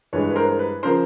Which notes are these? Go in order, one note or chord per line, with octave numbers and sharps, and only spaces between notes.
G2 E3 G#3 B4 C#5
B4
A#4 C5
B4
C#3 F3 A#4 C5